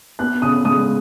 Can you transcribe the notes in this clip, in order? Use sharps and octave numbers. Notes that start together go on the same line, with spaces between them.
B3 F#6
C#3 D#6
G#3 D#6